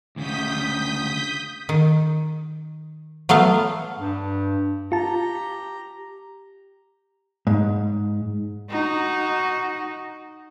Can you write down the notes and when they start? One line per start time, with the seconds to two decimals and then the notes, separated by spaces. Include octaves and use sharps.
0.16 D2 C#3 D#6 G6 B6
1.69 D#3
3.29 F#3 A3 B3 F5
3.99 G2
4.92 F4 G4 A5 A#5
7.47 G#2
8.70 D#4 F#4